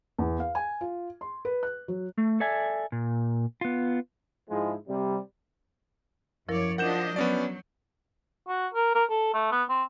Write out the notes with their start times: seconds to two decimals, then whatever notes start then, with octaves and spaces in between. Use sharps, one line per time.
0.18 E2
0.40 F5
0.55 G#5
0.81 F4
1.21 C6
1.45 B4
1.63 F#6
1.88 F#3
2.17 A3
2.40 A4 D5 E5 G#5
2.92 A#2
3.61 B3 F4
4.50 G#2 F3 G#3 E4
4.88 C3 G3
6.49 F#2 F3 E4 A#4 C#5 D5
6.78 F3 D4 A#4 D#5 F#5 G6 E7
7.16 F#3 B3 C#4 D5
8.48 F#4
8.74 A#4
8.95 A#4
9.10 A4
9.34 A3
9.52 B3
9.70 C4